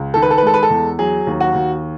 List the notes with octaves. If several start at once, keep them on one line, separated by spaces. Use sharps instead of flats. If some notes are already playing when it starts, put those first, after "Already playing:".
Already playing: C#2
D#3 A4
B4
A4
B4
G#3 A4
B4
A4
E2
F#3 G#4
D#2
F#4
D#2